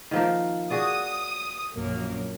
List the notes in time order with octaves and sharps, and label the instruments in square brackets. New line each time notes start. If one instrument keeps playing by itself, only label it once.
[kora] D#3 F3 A#3
[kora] F#4 G#4 D5 [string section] D#6
[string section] A#1 F#2 A#3